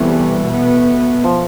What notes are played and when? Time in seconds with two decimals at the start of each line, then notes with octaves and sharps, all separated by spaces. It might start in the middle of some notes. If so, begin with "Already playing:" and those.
Already playing: E2 C3 E3 G3 A3 B3
0.42 B2
0.47 B3
1.24 F3